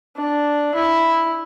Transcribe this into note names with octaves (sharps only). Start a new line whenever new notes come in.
D4
E4